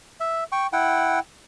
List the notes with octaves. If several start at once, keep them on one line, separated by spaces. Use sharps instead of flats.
E5
G5 C#6
E4 F#5 G5